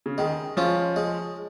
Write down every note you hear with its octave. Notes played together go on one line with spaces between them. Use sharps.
C#3
D#3 G#3
F3 C#4 F4
G#3